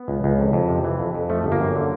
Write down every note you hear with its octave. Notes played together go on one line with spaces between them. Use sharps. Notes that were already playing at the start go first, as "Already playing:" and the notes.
Already playing: B3
C#2
C#2
F2
F2
C3
E3
F2
F2
F3 A3
G1
A#3
F#2
D3